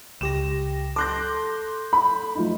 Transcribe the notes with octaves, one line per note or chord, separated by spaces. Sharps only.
C#2 G4 A#6 E7
A4 C6 D6 F#6 G6 A#6
B5
F3 A3 D#4